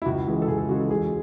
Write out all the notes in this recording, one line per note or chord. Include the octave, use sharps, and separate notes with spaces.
E4
C#2 F#4
C#3 E3 G#3
A4
C#2 G#4
A4
C#3 E3 G#3 F#4
A4
E1 G#4